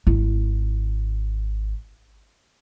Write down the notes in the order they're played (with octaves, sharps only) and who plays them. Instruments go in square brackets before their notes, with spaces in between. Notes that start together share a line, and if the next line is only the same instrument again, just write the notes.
[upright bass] G#1 E4